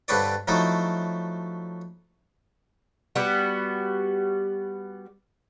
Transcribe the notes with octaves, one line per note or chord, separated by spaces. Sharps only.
G2 D3 C4 B4 C#5 D5
F3 F#3 A3 D#4 E4
G3 B3 F#4